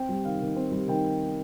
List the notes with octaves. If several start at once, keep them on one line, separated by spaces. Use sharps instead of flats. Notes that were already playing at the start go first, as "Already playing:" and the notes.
Already playing: C4 G5
G3
D#3 F5
D#3
C4
G3
D#3 G5